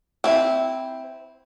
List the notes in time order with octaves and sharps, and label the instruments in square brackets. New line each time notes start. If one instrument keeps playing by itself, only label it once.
[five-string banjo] C4 E4